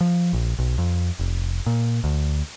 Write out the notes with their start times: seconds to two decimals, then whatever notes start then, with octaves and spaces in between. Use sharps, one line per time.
0.01 F3
0.33 A#1
0.59 B1
0.78 F2
1.19 F1
1.66 A#2
2.04 D2